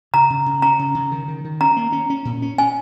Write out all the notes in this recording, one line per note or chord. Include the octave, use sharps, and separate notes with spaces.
C#3 A#5
C#3
C#3
C#4 A#5
C#3
C#3
D#3
D#3
D#3
C#4 A#5
A#3
C#4
C#4
A#2
C#4
C#4 G#5